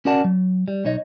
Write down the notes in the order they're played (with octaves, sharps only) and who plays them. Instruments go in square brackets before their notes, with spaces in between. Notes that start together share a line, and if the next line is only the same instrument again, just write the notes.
[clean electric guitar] C#4 F#4 A#4 D5 F#5 A5
F#3
G3
B1 D#4 C#5 D#5